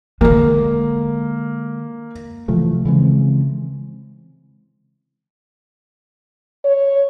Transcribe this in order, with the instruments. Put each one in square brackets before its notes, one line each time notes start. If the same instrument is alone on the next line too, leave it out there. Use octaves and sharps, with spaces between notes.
[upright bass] D3 G#3 [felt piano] A#3
[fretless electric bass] C3 E3 F3 A3
C#3 E3 G#3 C4
[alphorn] C#5